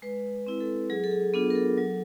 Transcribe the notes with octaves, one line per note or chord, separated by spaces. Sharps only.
G#3 B4
C4 E4
A4
F#3 G#4
A4
G#4
B3 D4 F4 A4
A#4
A4
F#3